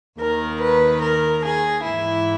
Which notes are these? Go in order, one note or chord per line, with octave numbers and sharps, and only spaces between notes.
D#2 D#3 A#4
B4
A#4
G#4
G#2 E3 E4